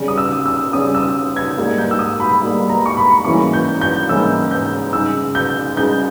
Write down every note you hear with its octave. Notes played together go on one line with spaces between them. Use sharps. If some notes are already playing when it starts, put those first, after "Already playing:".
Already playing: C#3 G3 C#4
D#6
E6
E6
C#3 G3 C#4 D#6
E6
G#6
G#2 G3 A#3
G6
E6
D#6
B5
G#2 G3 A#3
A#5
C#6
B5
G#2 E3 A#3 C#4 E4 C#6
G6
G6
G#2 E3 A#3 C#4 E4 E6
G6
C#3 G#3 D#4 E6
G6
C#3 G#3 D#4 G6